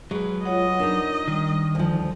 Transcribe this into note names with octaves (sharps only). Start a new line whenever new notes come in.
F#3 G#3 B4
F4 C#5 D#5 F#5
D4 D#4 A#4
D#3 G3
D2 F3